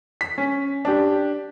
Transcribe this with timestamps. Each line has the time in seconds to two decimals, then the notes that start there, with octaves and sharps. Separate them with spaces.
0.21 B6
0.38 C#4
0.85 D4 G4